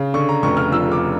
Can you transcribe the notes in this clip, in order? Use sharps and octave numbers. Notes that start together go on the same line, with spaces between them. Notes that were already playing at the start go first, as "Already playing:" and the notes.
Already playing: C#3
D3 C#6
A#5
F1 C#6
F6
F3 E6
D6